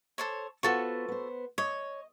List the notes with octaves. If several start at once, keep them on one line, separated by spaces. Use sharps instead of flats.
A4 C5 C#5
B3 F4 F#4 A4 C5 C#6
B3 C5
C#5 D#5